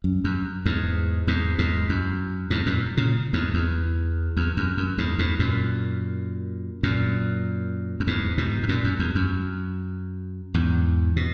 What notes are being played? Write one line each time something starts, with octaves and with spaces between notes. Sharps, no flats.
F#2
F#2
E2 G#2
E2 G#2
E2 G#2
F#2
E2 G#2
F#2 A#2
A#2 C#3
E2 G#2
E2
E2
F#2
F#2
E2 G#2
E2 G#2
F#2 A#2
F#2 A#2
F#2
E2 G#2
G#2 B2
G#2
F#2 A#2
F#2
E2
F#2
E2 G#2
B2